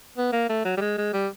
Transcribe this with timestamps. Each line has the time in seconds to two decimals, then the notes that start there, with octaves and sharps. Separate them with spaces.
0.18 B3
0.33 A#3
0.49 A3
0.65 F#3
0.77 G3
0.81 G#3
0.98 G#3
1.13 G3